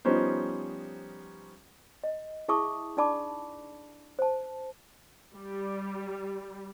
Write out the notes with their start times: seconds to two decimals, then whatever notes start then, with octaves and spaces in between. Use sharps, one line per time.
0.05 F3 G3 B3 C#4 D#4 C5
2.04 D#5
2.48 E4 G#4 E5 A5 C#6 D#6
2.97 D4 D#4 D5 A5 B5 D6
4.19 C5 A5
5.36 G3